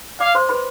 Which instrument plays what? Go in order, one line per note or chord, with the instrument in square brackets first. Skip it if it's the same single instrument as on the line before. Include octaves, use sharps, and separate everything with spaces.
[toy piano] D5 D6 [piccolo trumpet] F5
[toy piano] C5 C6
B4 B5